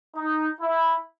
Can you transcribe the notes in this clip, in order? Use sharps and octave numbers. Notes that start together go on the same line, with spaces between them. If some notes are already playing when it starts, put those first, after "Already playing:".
D#4
E4